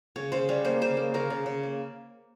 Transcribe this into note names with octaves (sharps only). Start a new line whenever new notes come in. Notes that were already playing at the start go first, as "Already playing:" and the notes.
C#3 C#5
C#3 C5
G3 C#5
A#3 C5
C#3 C5
A#3
C#3 A#4
C#3
C#3
A#3